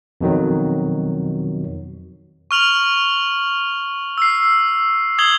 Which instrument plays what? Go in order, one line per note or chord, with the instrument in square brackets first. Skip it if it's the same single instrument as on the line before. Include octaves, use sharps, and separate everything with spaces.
[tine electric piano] F2 B2 D#3 F#3
[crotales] C#6 F6 F7 F#7
E6 C7
D#6 G#6 C7 F#7 G7